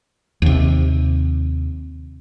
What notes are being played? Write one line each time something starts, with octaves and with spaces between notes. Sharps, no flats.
D#2 C3